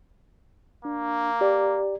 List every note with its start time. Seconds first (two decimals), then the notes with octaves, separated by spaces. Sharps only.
0.85 A#3 D4
1.41 G4 D5 A#5